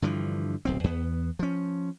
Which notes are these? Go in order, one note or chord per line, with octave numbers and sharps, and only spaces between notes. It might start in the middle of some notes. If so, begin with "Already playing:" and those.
G2 D3 E3 F3
D1 B1 C4
E2 B3
F3 C#4